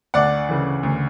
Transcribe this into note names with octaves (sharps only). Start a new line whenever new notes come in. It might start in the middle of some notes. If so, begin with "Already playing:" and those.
D2 D5 F#5
C#3 E3
D2